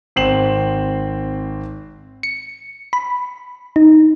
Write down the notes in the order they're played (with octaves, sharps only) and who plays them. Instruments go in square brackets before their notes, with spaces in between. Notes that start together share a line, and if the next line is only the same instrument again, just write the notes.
[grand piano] G#1 C4 C7 E7 F#7
[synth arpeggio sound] C#7
B5
D#4